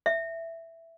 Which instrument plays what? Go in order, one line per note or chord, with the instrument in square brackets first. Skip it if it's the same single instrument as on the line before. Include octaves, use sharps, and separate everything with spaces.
[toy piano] E5